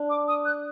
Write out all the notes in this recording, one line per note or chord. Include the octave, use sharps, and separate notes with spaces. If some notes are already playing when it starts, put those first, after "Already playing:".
Already playing: D4
D6
D#6
F#6